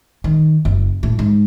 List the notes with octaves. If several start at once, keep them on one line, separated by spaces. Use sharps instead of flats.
D#3
F#1
A2
G#2